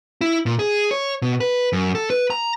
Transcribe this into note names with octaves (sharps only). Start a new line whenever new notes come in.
E4
A#2
G#4
C#5
B2
B4
F#2
A4
B4
A#5